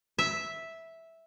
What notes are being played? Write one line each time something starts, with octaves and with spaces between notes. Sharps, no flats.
E5